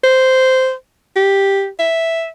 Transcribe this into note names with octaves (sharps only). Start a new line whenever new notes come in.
C5
G4
E5